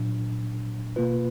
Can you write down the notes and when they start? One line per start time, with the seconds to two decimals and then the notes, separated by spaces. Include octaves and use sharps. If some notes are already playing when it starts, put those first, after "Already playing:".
Already playing: A#2 F#3 D4
0.96 B2 A#3 F4 B4